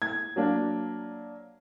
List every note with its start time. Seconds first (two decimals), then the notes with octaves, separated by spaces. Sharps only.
0.02 G#6
0.36 F#3 A#3 D4